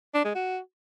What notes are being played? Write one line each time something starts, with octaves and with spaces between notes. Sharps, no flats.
D4
G#3
F#4